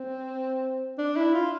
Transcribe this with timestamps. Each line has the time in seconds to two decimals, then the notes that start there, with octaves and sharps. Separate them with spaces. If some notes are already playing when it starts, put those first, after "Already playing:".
Already playing: C4
0.98 D4
1.16 E4
1.34 F4